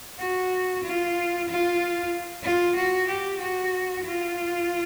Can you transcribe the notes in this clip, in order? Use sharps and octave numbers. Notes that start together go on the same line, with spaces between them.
F#4
F4
F4
F4
F#4
G4
F#4
F4